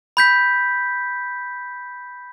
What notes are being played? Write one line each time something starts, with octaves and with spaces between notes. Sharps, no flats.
B5 G6 B6